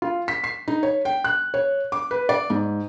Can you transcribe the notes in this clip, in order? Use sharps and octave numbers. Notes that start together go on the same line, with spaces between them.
F4
B6
C7
D#4
C#5
G5
F#6
C#5
D6
B4
D5
G#2